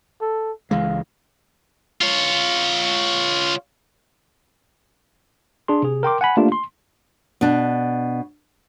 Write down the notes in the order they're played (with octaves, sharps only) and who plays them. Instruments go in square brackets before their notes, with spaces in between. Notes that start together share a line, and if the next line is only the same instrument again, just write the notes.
[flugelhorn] A4
[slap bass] C#2 E3 G#3 [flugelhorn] F5
[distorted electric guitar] F4 C#5
[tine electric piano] D4 G#4 C6
C3 G#4
A#4 G5 C6 D6
F#5 G#5 B5
A3 A#3 D4 F4 G4
C6
[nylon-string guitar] B2 D4